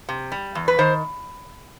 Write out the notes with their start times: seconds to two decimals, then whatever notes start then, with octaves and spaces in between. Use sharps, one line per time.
0.09 C3
0.32 G3
0.55 E2
0.68 B4
0.79 D#3 C5